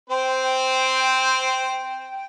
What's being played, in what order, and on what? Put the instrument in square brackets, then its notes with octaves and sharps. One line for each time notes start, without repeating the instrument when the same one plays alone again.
[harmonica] C4 C5 [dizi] G5